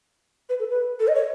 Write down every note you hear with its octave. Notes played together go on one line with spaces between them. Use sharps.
B4
A4
B4
A4
D#5
C#5